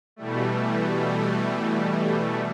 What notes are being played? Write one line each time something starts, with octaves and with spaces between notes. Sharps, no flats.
B2 E3 G3 A3